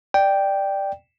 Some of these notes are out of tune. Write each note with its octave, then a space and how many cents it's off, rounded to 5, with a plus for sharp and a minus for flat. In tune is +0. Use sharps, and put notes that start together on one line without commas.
D5 +10 G5 +0